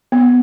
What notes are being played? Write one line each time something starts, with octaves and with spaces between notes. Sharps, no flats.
B3